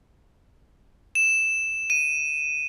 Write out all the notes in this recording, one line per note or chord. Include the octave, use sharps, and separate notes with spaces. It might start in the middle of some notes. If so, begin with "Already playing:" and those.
E7
D#7